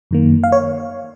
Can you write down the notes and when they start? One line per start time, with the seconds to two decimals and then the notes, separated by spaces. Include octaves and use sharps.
0.11 F#2 D#3 A#3
0.44 F5
0.52 C#5